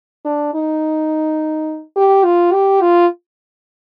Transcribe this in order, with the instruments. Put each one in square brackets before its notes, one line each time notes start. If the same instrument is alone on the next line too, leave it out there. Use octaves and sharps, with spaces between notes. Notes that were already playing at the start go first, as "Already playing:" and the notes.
[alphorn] D4
D#4
G4
F4
G4
F4